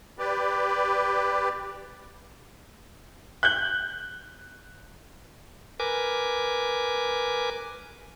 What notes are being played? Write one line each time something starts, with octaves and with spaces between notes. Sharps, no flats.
G4 B4 D5
F#6 G6
A#4 B4 G#5 D6